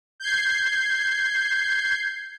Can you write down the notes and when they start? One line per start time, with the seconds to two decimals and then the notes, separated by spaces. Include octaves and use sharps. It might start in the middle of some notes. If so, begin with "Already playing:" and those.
0.20 G6 G#6 C7